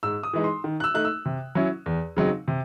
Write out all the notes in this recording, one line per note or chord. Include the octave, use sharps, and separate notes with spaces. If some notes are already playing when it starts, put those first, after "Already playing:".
G#2 E6
D#6
E3 G#3 D#4
C6
D#3
F#6
E6
A3 D#4 F#6
E6
C3
F#3 C#4 E4
E2
C#3 F#3 C4 D#4
C3